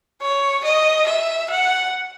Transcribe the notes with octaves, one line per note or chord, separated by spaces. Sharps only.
C#5
D#5
E5
F#5